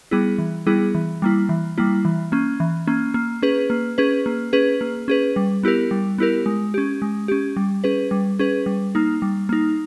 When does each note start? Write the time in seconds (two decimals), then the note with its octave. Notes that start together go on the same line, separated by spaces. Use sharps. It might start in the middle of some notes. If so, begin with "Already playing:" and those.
0.11 G3 B3 E4 G#4
0.38 E3
0.67 G3 B3 E4 G#4
0.95 E3
1.22 G3 A#3 E4
1.49 E3
1.78 G3 A#3 E4
2.05 E3
2.32 A#3 C#4
2.60 E3
2.87 A#3 C#4
3.14 A#3
3.42 C#4 G#4 B4
3.70 A#3
3.98 C#4 G#4 B4
4.26 A#3
4.53 C#4 G#4 B4
4.81 A#3
5.08 C#4 G#4 B4
5.36 G3
5.63 B3 E4 G4 A#4
5.91 G3
6.18 B3 E4 G4 A#4
6.46 G#3
6.74 C#4 G4
7.02 G#3
7.28 C#4 G4
7.56 G3
7.84 C#4 G#4 B4
8.11 G3
8.39 C#4 G#4 B4
8.66 G3
8.95 A#3 D#4
9.22 G3
9.49 A#3 D#4